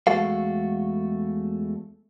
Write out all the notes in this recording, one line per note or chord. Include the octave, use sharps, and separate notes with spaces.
E2 G#3 A3 F#4 A4 F5